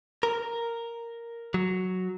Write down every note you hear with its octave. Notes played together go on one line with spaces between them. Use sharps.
A#4
F#3